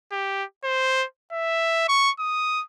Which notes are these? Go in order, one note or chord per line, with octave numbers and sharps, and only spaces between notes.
G4
C5
E5
C#6
D#6